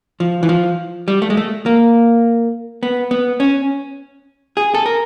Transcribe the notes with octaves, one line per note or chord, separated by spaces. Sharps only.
F3
E3
F3
G3
A3
G#3
A3
A#3
B3
B3
C#4
G#4
A4
A#4